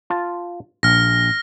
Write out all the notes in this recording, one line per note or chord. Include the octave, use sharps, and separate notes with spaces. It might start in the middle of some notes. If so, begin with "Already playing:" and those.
F4 A5
A#1 F6 A#6